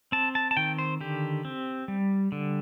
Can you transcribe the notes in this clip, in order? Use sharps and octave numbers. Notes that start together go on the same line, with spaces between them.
C4 A5
A5
A5
D#3 G5
C5
D3 G4
C4
G3
D3